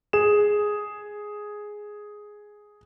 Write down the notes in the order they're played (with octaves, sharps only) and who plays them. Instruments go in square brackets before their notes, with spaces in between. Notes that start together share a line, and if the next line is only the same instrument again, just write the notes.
[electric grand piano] G#4 E7